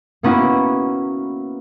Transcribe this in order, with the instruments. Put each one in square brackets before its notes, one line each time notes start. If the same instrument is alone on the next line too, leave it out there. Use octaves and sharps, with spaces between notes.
[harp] A#3 B3 C#4 E4 F#4